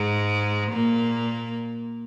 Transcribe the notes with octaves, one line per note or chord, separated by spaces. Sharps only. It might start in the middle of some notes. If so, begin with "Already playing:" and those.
Already playing: G#2 G#3
A#2 A#3